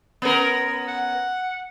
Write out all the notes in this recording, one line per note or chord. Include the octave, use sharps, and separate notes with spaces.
B3 C#4 A#4
F#5